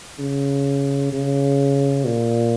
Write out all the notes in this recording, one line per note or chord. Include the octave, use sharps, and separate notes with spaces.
C#3
C#3
A#2